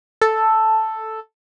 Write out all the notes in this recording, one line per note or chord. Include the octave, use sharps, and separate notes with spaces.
A4